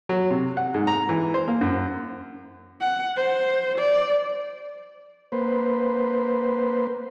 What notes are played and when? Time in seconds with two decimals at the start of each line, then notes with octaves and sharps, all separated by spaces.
0.09 F#3
0.30 C3
0.57 F#5
0.74 G#2
0.87 A#5
1.09 E3
1.34 C5
1.48 A#3
1.61 F#2
2.81 F#5
3.16 C5
3.78 D5
5.32 A#3 B4 C5